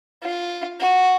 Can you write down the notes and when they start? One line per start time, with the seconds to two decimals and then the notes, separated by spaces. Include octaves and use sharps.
0.23 F4
0.80 F#4